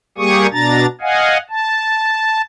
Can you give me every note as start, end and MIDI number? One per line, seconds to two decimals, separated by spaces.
0.18 0.47 55
0.18 0.47 58
0.18 0.47 67
0.18 0.47 68
0.18 0.47 85
0.18 0.47 87
0.52 0.86 47
0.52 0.86 62
0.52 0.86 82
0.52 0.86 93
1.01 1.37 75
1.01 1.37 77
1.01 1.37 78
1.01 1.37 80
1.49 2.41 81